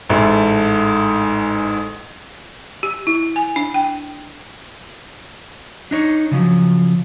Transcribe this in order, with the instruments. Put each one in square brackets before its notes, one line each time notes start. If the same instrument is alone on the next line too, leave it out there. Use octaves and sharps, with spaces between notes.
[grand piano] A1 G#2 A3
[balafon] G4
E4
G#5
D4
G5
[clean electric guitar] D4 D#4 C#5
C#3 F3 F#3